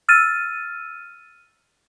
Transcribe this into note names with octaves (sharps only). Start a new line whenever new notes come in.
E6 F6 A6 D#7